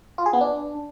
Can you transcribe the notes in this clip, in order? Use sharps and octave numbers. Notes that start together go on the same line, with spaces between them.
F4
G#4
B3
D4